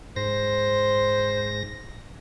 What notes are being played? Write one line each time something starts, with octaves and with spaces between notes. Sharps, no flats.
G#2 C5 A#6